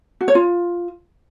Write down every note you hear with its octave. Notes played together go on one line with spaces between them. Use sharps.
F#4
C#5
F4